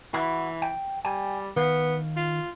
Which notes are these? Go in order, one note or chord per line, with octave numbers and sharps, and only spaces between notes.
E3 E4 F#4
G5
G3 G5 G#5
D#3 B3 F5
F4